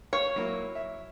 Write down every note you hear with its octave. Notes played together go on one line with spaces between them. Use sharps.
C#5 F5
F#3 A#3 E4
E5